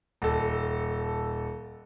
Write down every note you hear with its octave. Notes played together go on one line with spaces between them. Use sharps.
D#1 A4